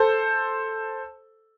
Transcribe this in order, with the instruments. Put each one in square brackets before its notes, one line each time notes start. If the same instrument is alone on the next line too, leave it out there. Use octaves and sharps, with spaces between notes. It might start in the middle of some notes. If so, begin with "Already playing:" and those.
Already playing: [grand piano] A4 C5